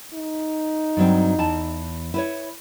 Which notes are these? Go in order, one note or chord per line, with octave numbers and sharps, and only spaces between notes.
D#4
G2 F#3 C4
E2 E3 A5
E4 B4 C#5